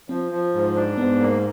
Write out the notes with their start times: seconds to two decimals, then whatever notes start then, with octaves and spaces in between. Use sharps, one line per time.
0.09 F3 C4
0.31 F3
0.54 G#2
0.75 D4
0.98 G#2 B3
1.20 A#3